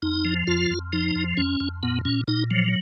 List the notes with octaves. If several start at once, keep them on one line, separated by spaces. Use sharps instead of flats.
F2 D#4
F3
F2 F4
F2
F3 D#4
F2
F2 C#4
F2
A#2 B3
A#2 C#4
A#2 D#4
F3 F#3